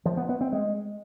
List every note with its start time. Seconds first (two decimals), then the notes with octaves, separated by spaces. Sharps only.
0.05 F3
0.17 B3
0.29 B3
0.41 C4
0.52 G#3